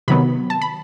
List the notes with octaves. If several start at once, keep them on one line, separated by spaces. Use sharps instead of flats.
C3 D#3 F#3 B3 B5
A5
B5